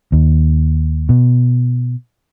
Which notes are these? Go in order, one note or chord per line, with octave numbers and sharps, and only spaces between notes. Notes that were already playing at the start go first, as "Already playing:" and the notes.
D#2
B2